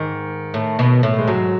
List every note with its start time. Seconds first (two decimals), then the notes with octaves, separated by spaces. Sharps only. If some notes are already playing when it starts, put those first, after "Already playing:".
Already playing: G#2 D#3
0.54 A2
0.79 B2
1.03 A2
1.19 G#3
1.27 G#2 F#3